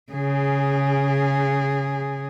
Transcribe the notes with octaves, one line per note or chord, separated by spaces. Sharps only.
C#3 G#4